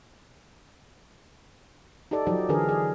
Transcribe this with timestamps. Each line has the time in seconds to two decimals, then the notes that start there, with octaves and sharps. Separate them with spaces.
2.11 D#4 G4 A4 D5
2.27 F3 F#3 D#4 G4 D5
2.49 D3 E3 D4 G#4 A#4
2.69 G#4